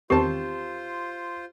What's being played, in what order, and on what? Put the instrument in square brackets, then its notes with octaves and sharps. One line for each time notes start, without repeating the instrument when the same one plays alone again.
[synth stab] E2 D#3 [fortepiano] C4 A5 [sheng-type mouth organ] F4 C5 [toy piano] G4